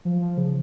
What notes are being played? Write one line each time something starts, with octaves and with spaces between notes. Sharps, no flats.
F3
F3
C#3